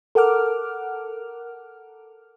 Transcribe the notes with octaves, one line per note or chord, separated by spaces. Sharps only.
A4 A#4 F#5 D6 F6